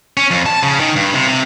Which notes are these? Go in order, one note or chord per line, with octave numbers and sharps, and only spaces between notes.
C#4
F2
A5
C#3
D#3
G2
C3
C3